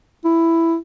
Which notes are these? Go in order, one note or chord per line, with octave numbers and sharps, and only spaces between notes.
E4